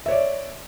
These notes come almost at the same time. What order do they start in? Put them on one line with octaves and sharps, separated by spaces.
E5 C#5 D5